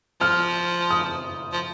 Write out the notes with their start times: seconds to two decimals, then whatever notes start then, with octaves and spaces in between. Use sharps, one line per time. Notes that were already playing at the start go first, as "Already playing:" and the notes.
0.21 F3 F6
0.91 D#6
1.53 F3